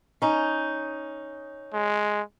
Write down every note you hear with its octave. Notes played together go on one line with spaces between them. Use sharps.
C#4 D#4
G#3